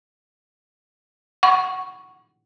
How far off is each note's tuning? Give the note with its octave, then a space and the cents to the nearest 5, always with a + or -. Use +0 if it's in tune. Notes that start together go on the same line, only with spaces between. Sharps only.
F#5 +10 C#6 +0